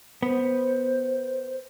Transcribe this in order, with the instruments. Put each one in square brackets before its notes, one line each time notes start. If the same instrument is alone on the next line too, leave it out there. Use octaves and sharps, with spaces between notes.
[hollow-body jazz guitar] B3 [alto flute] C5